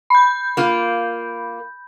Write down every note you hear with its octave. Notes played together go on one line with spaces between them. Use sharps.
B5 G6
A#3 F4